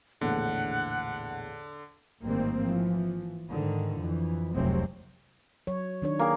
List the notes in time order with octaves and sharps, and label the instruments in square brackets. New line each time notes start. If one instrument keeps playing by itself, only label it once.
[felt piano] A#1 E2 A2 [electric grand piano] D3 [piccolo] F#5
[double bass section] A1 G#2 D#3 G3 A#3 C4
E3 F3
G#2 D3 D#3
F2 E3
F1 C2 C3 F#3 G#3 C4
[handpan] F#3 C#5
D#3 D4 C#5
[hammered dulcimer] A#3 G#4